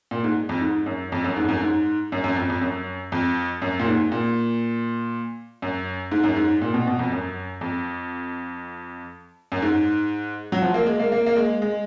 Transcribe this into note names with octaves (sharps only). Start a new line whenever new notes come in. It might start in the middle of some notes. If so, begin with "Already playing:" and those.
A#2
G#2
F2
G#2
F#2
F2
F#2
G#2
F2
F#2
G#2
F#2
F#2
F2
F2
F#2
F2
F#2
A#2
G#2
A#2
F#2
G#2
F#2
G#2
A#2
B2
B2
F2
F#2
F2
F#2
G#2
F#3
F3
A#3
G#3
A#3
A#3
A#3
G#3
G#3